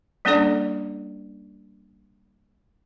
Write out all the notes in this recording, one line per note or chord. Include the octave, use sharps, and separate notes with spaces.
G3 A#3 C#4 D4 A4 D5